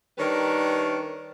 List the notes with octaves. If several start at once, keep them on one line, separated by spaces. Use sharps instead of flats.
D#3 G3 D4 A#4 B4 C#5